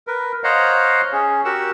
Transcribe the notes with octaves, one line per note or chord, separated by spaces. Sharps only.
A#4 B4
C5 C#5 D#5 F5 F#5 A#5
C#4 G#4
F#4 G4 A#4 F#5 E6